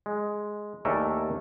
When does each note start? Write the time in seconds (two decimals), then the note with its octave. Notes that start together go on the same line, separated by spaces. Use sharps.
0.06 G#3
0.85 D#2 A3 D4 A4 A#4 G#5